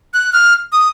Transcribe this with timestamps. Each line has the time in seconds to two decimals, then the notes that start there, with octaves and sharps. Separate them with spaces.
0.14 F#6
0.33 F6
0.73 D#6